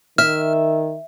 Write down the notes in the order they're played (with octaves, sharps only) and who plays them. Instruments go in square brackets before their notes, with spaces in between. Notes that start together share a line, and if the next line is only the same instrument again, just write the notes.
[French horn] D#3 [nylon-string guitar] E5 [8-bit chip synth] F6